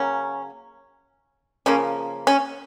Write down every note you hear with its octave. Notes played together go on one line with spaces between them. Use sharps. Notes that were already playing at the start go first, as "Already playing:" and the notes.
Already playing: C#3 F#3 A#3 C#4
C#3 F3 A#3 C#4
C#4